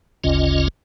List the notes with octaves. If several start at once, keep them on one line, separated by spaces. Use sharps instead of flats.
G1 D2 C#3 C#4 F4 D#5